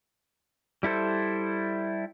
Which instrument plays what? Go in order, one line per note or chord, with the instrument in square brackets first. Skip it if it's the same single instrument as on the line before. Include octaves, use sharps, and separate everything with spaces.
[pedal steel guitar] G3 E4 A4 C5